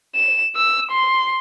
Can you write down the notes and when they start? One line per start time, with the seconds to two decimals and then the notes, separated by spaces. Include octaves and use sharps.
0.15 E7
0.56 E6
0.91 C6